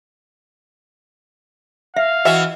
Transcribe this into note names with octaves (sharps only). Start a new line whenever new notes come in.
E5 F5
E3 F#4 D#5 E5